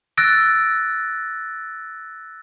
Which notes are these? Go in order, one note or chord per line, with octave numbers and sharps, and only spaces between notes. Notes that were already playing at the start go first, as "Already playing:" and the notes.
E6 F#6 A6 A#6 D7